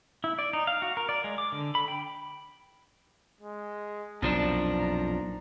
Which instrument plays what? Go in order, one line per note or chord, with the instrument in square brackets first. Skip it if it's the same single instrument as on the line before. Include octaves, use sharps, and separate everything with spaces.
[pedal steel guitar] E4
D5
D#4
F5
F#4
A#4
D5
G#3
D6
D3
B5
G5
[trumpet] G#3
[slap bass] B1 A#2 [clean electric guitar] F2 F3 D4 [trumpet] A#5